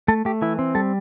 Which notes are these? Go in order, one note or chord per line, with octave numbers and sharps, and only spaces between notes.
A3 A4
A3 G4
E3 E4
C4
G3 A4